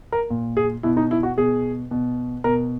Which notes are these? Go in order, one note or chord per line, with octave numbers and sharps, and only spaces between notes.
A#4
A#2
G#4
B2 E4
D#4
E4
F#4
B2 G#4
B2
B2 A#4